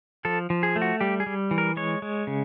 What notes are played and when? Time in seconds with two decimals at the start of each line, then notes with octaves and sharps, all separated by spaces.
0.25 F3 A4
0.50 F3
0.63 G#4
0.76 A3
0.82 F#4
1.01 G3 G4
1.20 G#4
1.27 G3
1.51 E3
1.58 A#4
1.77 G#3 C#5
2.02 G#3
2.27 C#3